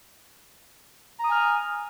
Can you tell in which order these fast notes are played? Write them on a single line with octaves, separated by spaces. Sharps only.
A#5 D#6 G#5 F6